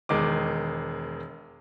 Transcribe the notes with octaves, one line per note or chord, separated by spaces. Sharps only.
E1 D#3 G#3 D6